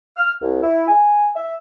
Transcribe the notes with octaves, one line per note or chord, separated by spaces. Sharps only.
F6
C2
E4
G#5
E5